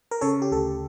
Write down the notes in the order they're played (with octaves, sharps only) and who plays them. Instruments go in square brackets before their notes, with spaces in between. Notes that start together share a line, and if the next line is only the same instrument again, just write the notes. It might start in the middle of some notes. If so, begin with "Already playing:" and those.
[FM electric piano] A#4
C#3 A4 C#5
G4
D2 A4